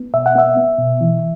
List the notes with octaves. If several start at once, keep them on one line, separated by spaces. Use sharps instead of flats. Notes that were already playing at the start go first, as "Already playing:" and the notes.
Already playing: B3
B2 E5
F#5
B3 E5
B3
B2
E3